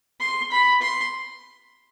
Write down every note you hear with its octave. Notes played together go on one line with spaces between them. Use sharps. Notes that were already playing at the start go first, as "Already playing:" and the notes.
C6
B5
C6